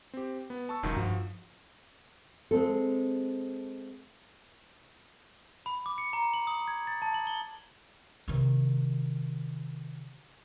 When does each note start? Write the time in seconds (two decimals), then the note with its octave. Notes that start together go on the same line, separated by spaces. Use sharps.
0.14 C4 G4
0.50 B3
0.69 A5 C#6 E6
0.83 E1 C#2 F#2 D#3
0.96 G2 F3 F#4
2.51 G#3 C4 A4
5.66 B5
5.86 D6
5.98 C#7
6.13 A#5
6.34 F#7
6.47 D#6
6.68 G#6
6.87 A6
7.02 A5
7.14 F#7
7.27 G7
8.28 C3 D#3